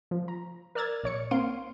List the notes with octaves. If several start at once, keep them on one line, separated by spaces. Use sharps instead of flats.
F3
A#5
A#4 D5 E6 F6 G#6 A6
A#1 C#5 C#7
A#3 C4 F5 C6 D7